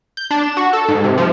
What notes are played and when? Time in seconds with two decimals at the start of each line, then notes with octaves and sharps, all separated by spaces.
0.17 G6
0.31 D4
0.44 E7
0.57 F#4
0.73 A4
0.88 G#2
1.04 C3
1.18 F3